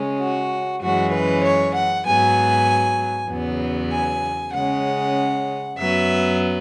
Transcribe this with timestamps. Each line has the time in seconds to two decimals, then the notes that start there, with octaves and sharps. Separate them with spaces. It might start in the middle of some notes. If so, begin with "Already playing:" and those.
Already playing: C#3 G#3 C#4
0.20 F#4
0.81 F#2 E3 G#3 C#4 F#4
1.12 B4
1.43 C#5
1.75 F#5
2.05 G#2 F#3 B3 G#5
3.29 E2 C#3 F#3 B3
3.92 G#5
4.53 C#3 G#3 C#4 F#5
5.77 F#2 F#3 B3 E5